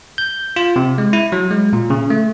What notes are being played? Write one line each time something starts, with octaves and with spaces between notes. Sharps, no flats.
G6
F4
C3
G#3
E4
F#3
G#3
A#2
C#3
A3